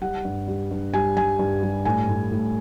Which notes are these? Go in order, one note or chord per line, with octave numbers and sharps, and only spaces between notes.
G3 F#5
G2
G3
G2
G3 G#5
G3 G#5
G2
G3
A2 G#5
A2
A2